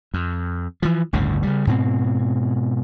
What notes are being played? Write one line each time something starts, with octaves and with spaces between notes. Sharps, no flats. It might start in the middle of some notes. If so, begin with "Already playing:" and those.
F2
E3 F3
G1 D2 A2 C#3
C#3 G3
G#2 B2 C4